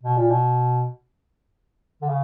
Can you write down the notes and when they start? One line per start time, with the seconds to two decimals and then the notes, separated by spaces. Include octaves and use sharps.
0.03 B2
0.17 A#2
0.30 B2
2.02 D3
2.09 C#3